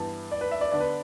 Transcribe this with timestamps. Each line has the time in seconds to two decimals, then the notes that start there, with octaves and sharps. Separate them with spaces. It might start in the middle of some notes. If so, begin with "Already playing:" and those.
Already playing: G2 E3 B3 A5
0.32 D5
0.41 B4
0.51 E5
0.61 D5
0.71 D3 B3 D4 D5
0.80 B4